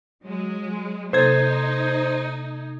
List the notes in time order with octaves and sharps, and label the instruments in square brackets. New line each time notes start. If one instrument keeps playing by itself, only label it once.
[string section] F#3 G#3
[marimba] C3 A#3 A4 [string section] D#4 [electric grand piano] C5 G#6